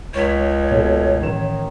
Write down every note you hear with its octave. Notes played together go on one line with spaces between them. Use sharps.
C#2 C#5 C#6 B6
B2 A3
A1 D#3 E7